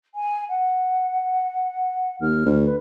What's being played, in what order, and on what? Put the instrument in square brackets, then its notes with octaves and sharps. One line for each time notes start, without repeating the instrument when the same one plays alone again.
[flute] G#5
F#5
[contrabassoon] D#2 [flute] F6
[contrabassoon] D2
[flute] B4